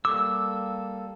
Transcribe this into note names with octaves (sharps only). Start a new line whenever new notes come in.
G3 A#3 A4 D6 E6